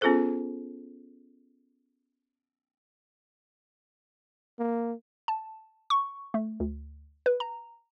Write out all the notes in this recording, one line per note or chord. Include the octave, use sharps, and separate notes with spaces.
B3 C#4 F4 G#4 A4 C5
A#3
A5
C#6
A3
D2
B4
A#5